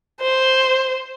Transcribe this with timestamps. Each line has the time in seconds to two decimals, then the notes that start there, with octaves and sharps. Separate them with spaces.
0.21 C5